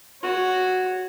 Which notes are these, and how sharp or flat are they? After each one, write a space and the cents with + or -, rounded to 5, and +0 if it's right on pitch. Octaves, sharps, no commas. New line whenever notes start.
F#4 +0 C#5 +0